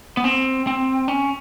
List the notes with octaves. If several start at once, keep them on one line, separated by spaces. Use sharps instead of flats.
B3
C4
C4
C#4